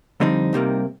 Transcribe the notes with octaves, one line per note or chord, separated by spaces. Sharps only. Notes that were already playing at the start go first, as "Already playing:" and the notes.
F2 D3 G3 C4 D#4
C2 C3 G3 A#3